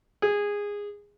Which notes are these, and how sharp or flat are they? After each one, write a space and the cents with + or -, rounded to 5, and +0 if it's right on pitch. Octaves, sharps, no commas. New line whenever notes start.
G#4 -15